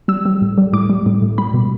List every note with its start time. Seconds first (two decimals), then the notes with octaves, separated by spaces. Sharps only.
0.08 G3 E6
0.26 G3
0.42 A2
0.58 G3
0.73 A2 D6
0.90 G3
1.06 A2
1.22 A2
1.38 G3 B5
1.54 B2